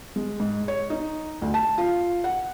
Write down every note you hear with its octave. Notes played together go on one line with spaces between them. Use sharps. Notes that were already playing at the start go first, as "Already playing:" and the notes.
G#3
G#2
C#5
D#4
D2
A5
F4
F#5